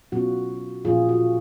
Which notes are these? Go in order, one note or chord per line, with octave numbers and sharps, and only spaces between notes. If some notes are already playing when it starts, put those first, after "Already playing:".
B2 F#3 C#4 F4 F#4
A#2 F3 G#3 C#4 F4 G#4
F#4